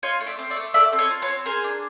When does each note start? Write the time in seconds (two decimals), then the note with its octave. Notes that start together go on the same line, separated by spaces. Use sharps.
0.03 F4 C#5 D#5
0.21 A3
0.26 D5 E5
0.39 C4
0.50 D5 E5
0.56 A3
0.74 A4 D5 E5
0.92 C4
0.99 C#5 D#5
1.10 F4
1.22 B4 C#5
1.29 C4
1.46 G#4 A#4 C5
1.64 D4